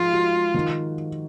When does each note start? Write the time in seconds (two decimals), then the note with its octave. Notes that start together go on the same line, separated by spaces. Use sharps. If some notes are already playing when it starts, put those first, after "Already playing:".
Already playing: G#2 F3 F4
0.13 F#4
0.54 D#3